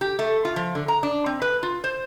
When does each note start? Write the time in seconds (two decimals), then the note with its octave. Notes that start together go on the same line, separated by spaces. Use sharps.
0.01 G4
0.19 A3
0.45 F4
0.56 F3
0.75 D3
0.88 A#5
1.03 D4
1.26 C4
1.42 B4
1.63 F4
1.84 C5